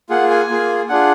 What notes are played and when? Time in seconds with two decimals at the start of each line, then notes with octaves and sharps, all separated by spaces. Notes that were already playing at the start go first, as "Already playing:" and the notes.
0.09 A#3 F4 G#4 F#5
0.30 G#5
0.50 A#3 F4 G#4
0.89 D4 F4 G#4 F#5